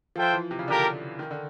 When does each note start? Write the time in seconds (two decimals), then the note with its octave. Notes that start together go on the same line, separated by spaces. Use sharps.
0.16 F3 F4 A4 C5 E5 G5
0.33 E3
0.51 C3
0.59 C#3
0.68 D3 A#3 D4 G4 A#4
1.19 D#3
1.31 D3